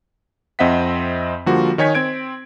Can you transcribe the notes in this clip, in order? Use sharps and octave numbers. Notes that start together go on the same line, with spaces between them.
F2 C4 D#5 E5 F#5 B6
D3 F3 G3 A#3 F4 F#4
D#3 D#4 C#5 G#5 G#6 B6
C4 G#6 D7